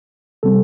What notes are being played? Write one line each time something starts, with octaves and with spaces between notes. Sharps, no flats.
C3 G3 C4 A4